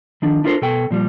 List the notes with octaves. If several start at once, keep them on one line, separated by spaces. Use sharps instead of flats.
D#3 F3 D4
D4 E4 F4 A4 A#4 C5
B2 A4 G5
A#2 F3 G3